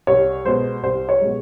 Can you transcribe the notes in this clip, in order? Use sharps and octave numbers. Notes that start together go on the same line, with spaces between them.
C2 C#5
B2 G#3 C5
C2 C5
C#5
B2 G#3